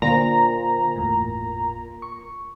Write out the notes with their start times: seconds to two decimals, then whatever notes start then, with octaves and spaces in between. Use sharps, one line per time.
0.02 A#2 D3 A#3 C5 A#5
0.96 G1 E2 A2
2.02 C#6